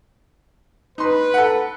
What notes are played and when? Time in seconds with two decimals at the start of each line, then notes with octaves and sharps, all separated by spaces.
0.98 D#4 B4 C6
1.34 A4 F#5